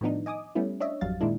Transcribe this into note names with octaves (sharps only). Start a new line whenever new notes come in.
A2 D#3 F3 B3 D4 D#4
D#5 G#5 D6 D#6
G3 A3 B3 C#4 E4
D4 C#5 D#5 E5
G#1 F2 F#3 G3 F5 A6
A#2 D#3 G#3 D4 E4